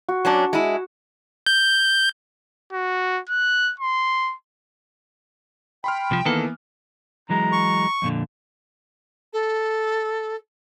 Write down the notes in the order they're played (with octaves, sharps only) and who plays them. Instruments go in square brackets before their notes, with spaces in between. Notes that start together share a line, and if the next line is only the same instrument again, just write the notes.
[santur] F#4
[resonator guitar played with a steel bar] F#3 C#4 D4
G#3 E4
[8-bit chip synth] G6
[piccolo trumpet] F#4
F#6
C6
[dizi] G5 [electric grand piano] B5 C6 F6
[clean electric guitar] C2 F3
[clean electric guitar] D#3 A4 [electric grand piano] E3 A#3 B3
[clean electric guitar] E3 F#3 G#3 [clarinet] A#5
[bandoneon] C#6
[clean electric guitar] F2 A#2 D3
[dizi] A4